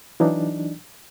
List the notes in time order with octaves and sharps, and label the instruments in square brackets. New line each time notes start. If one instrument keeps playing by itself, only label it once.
[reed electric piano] E3 F#3 D4 D#4